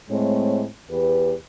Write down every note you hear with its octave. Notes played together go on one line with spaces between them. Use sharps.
A2 G#3 A3 C4 C#5
E2 G4 B4